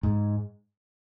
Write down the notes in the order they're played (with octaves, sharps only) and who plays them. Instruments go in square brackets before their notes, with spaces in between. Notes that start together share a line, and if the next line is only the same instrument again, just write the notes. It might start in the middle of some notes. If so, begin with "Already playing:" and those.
[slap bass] G#2